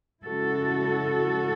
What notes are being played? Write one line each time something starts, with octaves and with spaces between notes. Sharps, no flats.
C#3 G#3 C#4 E4 F#4 A4